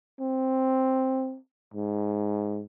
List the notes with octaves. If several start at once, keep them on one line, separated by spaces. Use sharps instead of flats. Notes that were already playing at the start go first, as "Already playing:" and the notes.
C4
G#2